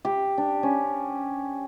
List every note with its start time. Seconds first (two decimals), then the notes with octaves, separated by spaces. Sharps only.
0.05 G4
0.38 D4
0.63 C#4